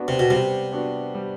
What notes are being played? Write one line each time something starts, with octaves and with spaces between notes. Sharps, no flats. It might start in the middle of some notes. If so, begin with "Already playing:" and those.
Already playing: B3 D4 F#4
C3
B2
C3 G3
B3 D4 F#4
G3